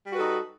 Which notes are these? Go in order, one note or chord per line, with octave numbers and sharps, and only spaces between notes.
G3 D#4 F#4 A4 B4